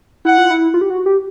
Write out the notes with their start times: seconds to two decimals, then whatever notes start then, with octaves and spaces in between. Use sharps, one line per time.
0.25 E4 F#5
0.38 F4
0.50 E4
0.74 F4
0.81 G4
0.90 F#4
1.06 G4